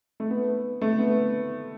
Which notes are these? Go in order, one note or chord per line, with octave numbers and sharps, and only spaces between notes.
A3
B3
A3
B3